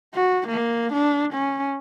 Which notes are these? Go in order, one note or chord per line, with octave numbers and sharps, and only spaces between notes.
F#4
A#3
D4
C#4